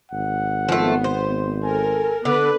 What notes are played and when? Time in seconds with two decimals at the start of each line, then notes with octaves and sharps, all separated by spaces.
0.12 G#1 F#5
0.69 F3 A3 B3
1.04 C5
1.64 A4 A#4 G#5
2.25 D3 B3 B4 D6